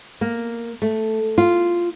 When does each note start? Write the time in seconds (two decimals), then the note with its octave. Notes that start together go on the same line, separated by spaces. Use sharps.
0.21 A#3
0.82 A3
1.38 F4